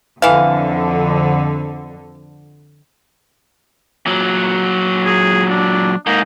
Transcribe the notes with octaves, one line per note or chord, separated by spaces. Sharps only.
F2 D3 E3 F5
A#2 F#3
G#4
D4
G#2 A#3 D#4